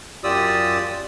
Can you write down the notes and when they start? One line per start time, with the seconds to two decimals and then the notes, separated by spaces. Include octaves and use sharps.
0.24 F#2 F4 G4 D5 D#6 E6